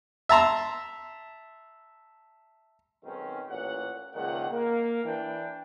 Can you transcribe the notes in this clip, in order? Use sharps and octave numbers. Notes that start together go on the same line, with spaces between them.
E5 A5 A#5 C6
B1 G#2 D#3 C4 C#4
A1 A#2 C#4 F#5
C#2 A#2 D#3 F3 F#5
A#3
E3 D4 G5